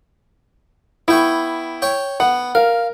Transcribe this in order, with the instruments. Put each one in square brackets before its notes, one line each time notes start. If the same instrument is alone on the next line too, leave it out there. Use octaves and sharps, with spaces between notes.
[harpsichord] B3 G5 C#6 [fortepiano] E4
[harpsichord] C#5 G5
[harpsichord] B3 [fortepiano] F#5
[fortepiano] A#4 [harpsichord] F5